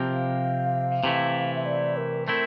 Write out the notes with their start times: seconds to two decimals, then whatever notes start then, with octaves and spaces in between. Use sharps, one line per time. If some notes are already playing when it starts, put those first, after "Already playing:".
Already playing: C3 F3 C4 G4 A#4
0.11 F5
1.04 C3 E3 A3 E4
1.56 E5
1.66 D5
1.97 A#4
2.28 A3 C4 E4 A#4